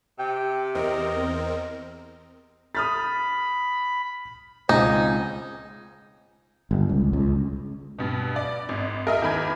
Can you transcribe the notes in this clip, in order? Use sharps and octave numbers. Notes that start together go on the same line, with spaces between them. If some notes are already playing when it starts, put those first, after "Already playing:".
C3 G5
E2 C4 A#4 D#5
B5 D#6 F6 A6
C#2 C4 D#4 G#5
G1
C#2
C#2
G2 B2
D5
G#1
A#4 D#5 E5
E2 D#3 B5 G#6